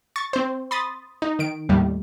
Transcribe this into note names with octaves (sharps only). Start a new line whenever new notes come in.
C#6 A6
C4 C5
B5 C6 D#6 A6
D#4
D#3 D7
D#2 A2 G3